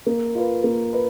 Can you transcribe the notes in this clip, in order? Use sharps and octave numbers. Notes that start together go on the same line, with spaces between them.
A#3
F4 B4
A#3
B4